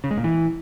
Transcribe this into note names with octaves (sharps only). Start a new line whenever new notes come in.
C#3
G#3
A#2
E3